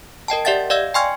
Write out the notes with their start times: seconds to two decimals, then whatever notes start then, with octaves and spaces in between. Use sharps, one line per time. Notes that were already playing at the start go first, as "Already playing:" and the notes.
0.28 A#4 D#5 G5 A5
0.45 G4 D5 E5 F#5 A6
0.70 D5 D#5 F5 E6 G#6
0.94 G5 G#5 C6 C#6 F6 G#6